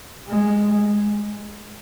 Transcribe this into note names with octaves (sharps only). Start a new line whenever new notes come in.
G#3